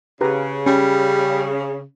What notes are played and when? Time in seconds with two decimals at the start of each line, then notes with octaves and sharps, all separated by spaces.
0.21 C#3 G4 B4 A#5
0.66 G3 C#4